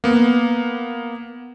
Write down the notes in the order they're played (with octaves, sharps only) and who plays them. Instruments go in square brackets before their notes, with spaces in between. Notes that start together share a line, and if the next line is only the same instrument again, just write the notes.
[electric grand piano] A#3 B3